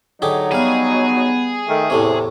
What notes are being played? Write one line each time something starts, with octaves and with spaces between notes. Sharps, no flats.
D3 F#3 D#4 G4 G#4
G3 B3 G#4 F5
D#3 A3
E2 A2 C3 A3 C#5